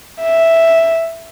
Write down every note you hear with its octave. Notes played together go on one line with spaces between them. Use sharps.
E5